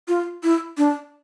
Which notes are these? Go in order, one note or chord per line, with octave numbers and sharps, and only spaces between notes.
F4
E4
D4